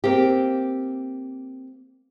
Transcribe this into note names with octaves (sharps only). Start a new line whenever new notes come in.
A#3 C4 G4